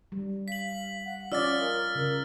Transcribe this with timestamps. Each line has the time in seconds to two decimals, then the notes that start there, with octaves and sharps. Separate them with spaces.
0.12 G3
0.48 F5 B6 F#7
1.05 F#5
1.32 C#4 F4 D5 D#5 E6 F6 A6
1.60 A#4
1.95 C#3 A#4